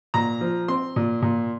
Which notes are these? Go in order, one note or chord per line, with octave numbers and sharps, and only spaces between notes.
A#2 A#5
F3
C4 C6
A#2
A#2